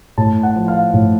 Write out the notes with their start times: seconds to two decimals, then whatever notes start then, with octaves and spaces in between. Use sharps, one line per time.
0.18 A2 A5
0.43 F#5
0.56 F3
0.68 F5
0.94 A2